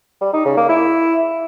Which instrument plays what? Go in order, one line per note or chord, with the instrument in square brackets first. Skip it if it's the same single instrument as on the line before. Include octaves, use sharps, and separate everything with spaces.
[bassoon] G3
D#4
C#3
A#3
E4